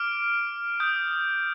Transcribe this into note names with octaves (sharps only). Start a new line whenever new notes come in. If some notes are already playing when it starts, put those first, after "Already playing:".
Already playing: D6 F6 D7
D#6 G6